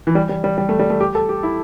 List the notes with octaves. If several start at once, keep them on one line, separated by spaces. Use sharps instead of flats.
E3
G3
G3
G3
G3
A3
G3
A3
G4
A4
G4
E4